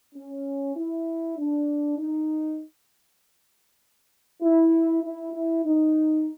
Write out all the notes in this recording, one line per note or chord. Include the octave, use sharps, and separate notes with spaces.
C#4
E4
D4
D#4
E4
E4
E4
D#4